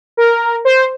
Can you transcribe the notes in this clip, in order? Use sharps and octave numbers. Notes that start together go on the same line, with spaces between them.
A#4
C5